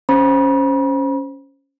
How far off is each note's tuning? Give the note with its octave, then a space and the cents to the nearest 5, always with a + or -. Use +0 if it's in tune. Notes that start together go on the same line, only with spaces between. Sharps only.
C#4 +0 C5 +0 B5 -45